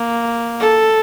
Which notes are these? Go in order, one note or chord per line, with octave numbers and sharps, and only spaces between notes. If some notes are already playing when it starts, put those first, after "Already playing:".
Already playing: A#3
A4